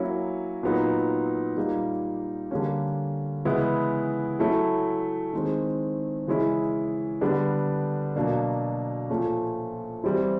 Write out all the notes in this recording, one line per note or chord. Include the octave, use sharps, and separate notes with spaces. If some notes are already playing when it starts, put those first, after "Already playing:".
Already playing: F#3 A#3 C#4 E4
A#2 F#3 B3 D#4
A#2 G3 A#3 D#4
D3 G3 A#3 C#4
C#3 E3 G#3 B3 E4
F#3 A3 C#4 E4
D#3 G#3 C4
C#3 E3 G#3 C#4 E4
D3 G3 B3 D4
B2 F#3 A#3 D4
A#2 F3 A3 C#4
E3 G3 C4 E4